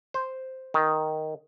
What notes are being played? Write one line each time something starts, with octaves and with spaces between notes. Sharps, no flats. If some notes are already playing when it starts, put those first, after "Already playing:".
C5
D#3